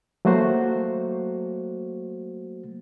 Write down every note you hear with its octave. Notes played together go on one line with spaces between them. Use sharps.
F#3 A3 A#3 F#4 C5